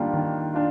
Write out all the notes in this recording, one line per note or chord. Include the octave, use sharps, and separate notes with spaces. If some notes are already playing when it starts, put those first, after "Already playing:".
Already playing: D#3 G3 A#3 D4 F4
D#3
D4 F4